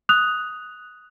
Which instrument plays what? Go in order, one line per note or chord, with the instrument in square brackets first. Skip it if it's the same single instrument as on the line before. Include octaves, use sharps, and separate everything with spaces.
[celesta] D#6 F#6 F7